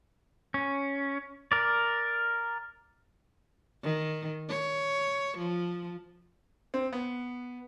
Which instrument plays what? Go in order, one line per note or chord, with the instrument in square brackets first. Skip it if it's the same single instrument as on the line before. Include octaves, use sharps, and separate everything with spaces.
[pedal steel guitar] C#4
A#4 D5
[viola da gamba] D#3
C#5
F3
[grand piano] C4
B3